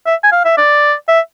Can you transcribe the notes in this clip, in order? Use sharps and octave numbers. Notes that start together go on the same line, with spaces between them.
E5
G#5
F5
E5
D5
E5